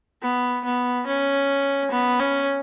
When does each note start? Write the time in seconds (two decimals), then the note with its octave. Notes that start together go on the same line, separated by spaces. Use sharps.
0.22 B3
0.65 B3
1.06 C#4
1.91 B3
2.20 C#4